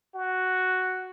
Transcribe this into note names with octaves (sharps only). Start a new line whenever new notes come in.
F#4